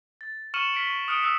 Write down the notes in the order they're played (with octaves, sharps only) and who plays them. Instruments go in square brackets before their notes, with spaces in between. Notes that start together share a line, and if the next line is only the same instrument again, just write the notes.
[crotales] A6
C#6 F6 C#7 D#7 E7 F#7
F6 B6 D7
C#6
D#6 F6 F#6 C#7 D7
D#6 E6 F#6 B6